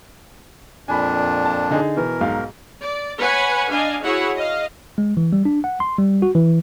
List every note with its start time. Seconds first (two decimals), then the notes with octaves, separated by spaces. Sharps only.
0.88 F2 A#2 D4 G#5 B5
1.45 A5
1.71 D3 D#4 G#4
1.97 B2 E3 A#4
2.21 B1 G#2 F5
2.83 D5
3.19 B4 C#5 F#5 G#5 B5
3.70 D4 D#5 F5 G#5
4.03 E4 F#4 G#4 C#5 F#5
4.36 D#5 F5
4.98 G#3
5.17 E3
5.33 G3
5.45 D4
5.64 F#5
5.80 C6
5.98 G3
6.22 F#4
6.35 E3